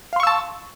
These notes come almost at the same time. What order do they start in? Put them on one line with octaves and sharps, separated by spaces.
F5 C6 C#6 E6 A5